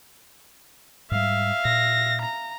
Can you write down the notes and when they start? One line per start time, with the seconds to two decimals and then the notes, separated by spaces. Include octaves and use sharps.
1.11 G#2 G3 E5 F5
1.65 A#2 A#6
2.22 A#5